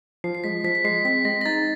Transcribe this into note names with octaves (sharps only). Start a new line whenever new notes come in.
F3 C7
C7
G#3 B6
F3 B6
B6
G#3 C7
C4 B6
G#3 A#6
A#6
D#4 A6